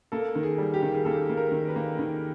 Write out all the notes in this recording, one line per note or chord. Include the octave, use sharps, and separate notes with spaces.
A#3 A4
D#3
G#4
G3
G4
D#3
G#4
A#3 A4
A#3
A#4
D#3
B4
A#3
D#3